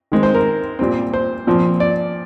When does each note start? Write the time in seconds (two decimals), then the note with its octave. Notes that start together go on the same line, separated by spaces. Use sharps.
0.12 D#3 G#3 C4
0.23 C5
0.35 A#4
0.79 A#2 G3 C4
1.14 C5
1.47 A#2 F3 C4
1.80 D5